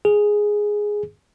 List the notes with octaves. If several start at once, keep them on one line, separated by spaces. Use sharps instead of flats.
G#4